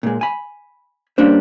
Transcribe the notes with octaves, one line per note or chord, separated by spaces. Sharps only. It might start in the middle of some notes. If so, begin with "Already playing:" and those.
A#2 G#3
G#5 B5
G3 A#3 C#4 D4 C5